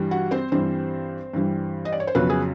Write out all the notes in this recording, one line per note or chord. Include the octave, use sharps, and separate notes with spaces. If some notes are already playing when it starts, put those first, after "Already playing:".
Already playing: G2 E3 G3
F#4 F#5
C4 C5
G2 E3 G3 C4 C5
G2 E3 G3
D#5
D5
C#5
C5
F2 C#3 F#3 B3 B4
G#4